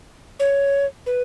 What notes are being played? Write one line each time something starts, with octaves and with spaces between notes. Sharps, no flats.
C#5
B4